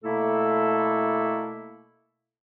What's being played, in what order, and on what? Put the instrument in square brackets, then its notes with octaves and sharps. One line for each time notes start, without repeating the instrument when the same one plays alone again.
[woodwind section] B2 A3 A#3 E4 A4